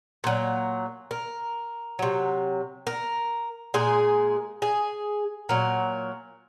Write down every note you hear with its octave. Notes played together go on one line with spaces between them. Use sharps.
A#2 F#3
A#4
C3 F#3
A#4
A#2 G#3 G#4
G#4
A#2 F#3 A#4